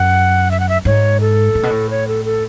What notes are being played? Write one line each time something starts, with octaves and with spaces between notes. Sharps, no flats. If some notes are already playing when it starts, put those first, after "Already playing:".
Already playing: F#2 F#5
E5
F#5
E5
G#2 C#5
A4
A2
B2
A2
C#5
A4
A4